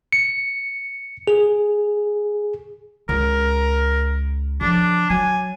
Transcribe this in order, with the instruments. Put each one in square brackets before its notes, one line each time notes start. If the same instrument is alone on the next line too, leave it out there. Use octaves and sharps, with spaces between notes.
[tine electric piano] C#7
G#4
[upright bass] C#2 [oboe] A#4
[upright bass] C#3 F3 [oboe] D4
[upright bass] F#3 [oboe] G#5